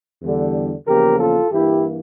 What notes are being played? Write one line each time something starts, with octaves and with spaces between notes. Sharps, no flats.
E2 D3 G3
E2 C#3 F3 A#3 G4 A#4
F4 A4
G2 E3 A#3 E4 G4